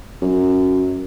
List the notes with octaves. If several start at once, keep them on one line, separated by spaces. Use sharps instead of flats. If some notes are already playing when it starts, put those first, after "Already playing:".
F#2